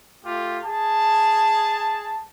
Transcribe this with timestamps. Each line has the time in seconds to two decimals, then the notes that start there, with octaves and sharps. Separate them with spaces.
0.25 A3 F4 G4
0.65 G#4 A5